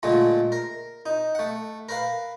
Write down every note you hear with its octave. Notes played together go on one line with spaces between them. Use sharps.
A#2 D3 G#3 A3
A#4
D#4
A3 F#5
A#4 B4 F5